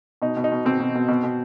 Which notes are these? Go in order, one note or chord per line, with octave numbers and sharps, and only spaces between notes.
B2 D#4
B2
D#4
B2
B2 C4
B2
B2
B2
B2